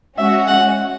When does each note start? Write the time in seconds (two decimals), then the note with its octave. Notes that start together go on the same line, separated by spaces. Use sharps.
0.18 G#3 C#4 F#4 E5
0.48 F#5